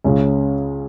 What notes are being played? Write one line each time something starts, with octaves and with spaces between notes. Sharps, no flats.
C#2 C#3 C#4